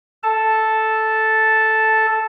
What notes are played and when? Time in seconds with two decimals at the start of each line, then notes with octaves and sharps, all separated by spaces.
0.23 A4 A5